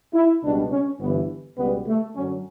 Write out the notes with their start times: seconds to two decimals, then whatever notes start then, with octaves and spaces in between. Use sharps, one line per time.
0.13 E4
0.42 C#2 B2 G3 D4
0.71 C#4
0.99 G1 G2 E3 B3
1.57 C#2 B2 G3 B3
1.86 A3
2.15 F#2 D3 F#3 C#4